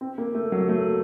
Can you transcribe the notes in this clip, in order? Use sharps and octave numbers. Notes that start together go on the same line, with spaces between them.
C4
A#3
A3
F#3
A3